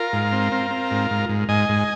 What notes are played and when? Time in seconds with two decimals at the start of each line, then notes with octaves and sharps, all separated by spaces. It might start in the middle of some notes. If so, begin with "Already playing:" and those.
Already playing: F4 A#4
0.13 G#2
0.32 C4
0.52 C4
0.71 C4
0.91 G#2
1.11 G#2
1.29 G#2
1.48 G#2 D#5 G#5
1.69 G#2